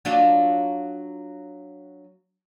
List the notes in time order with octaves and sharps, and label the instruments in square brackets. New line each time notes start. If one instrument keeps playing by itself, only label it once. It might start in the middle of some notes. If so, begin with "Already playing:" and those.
[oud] F#3 D4 F4